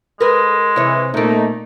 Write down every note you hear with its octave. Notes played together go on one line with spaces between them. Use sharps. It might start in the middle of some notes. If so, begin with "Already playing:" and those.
G#3 A#4 B4
C3 E3 C#5
A#2 A3 A#3 D#4